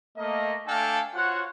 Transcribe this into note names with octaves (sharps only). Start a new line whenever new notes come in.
A3 A#3 D#5
A3 D4 A4 F5 G5 G#5
F4 F#4 C5 C#5 F#5